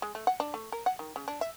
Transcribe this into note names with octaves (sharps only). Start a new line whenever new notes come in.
G#3
A3
F#5
D4
A3
A#4
F#5
D#3
C#3
D4
E5